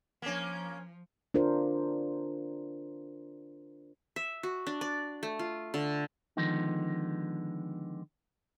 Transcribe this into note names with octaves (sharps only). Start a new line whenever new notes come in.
F3 A#3 C#4
D4 F4 A#4 C5
E5
F#4
D4
D5
A3
F4
D3
D3 D#3 F3 G#3 B3 D#4